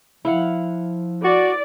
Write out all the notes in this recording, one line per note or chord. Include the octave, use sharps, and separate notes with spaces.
F3 E4 F5 F#5
F#4 D5